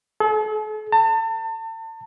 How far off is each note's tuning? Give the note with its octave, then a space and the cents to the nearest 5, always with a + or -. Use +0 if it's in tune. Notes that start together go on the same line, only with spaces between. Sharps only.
A4 -45
A5 +35